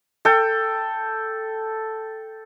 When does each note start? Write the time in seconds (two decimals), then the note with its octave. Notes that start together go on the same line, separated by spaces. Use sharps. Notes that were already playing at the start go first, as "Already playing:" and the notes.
0.25 A4 G5